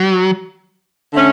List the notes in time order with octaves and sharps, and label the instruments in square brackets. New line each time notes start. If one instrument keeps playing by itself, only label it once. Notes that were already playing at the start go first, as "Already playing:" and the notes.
Already playing: [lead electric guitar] F#3
[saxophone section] D3 A3 C#4